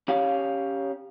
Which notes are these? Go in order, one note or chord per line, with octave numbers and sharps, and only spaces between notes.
C#4 G4 C#5 F5